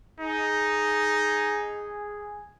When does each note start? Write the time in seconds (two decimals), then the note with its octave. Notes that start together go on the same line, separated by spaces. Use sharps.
0.20 D#4 G#4